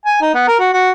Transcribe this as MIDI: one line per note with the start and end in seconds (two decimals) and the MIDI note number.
0.05 0.20 80
0.21 0.31 63
0.34 0.43 59
0.48 0.58 70
0.59 0.68 66
0.73 0.91 66